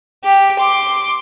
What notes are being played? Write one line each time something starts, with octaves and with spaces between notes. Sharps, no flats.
G4
C6 D6